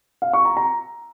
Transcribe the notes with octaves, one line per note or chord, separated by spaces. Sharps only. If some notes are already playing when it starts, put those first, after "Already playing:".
F5
C#6
A#5
A#5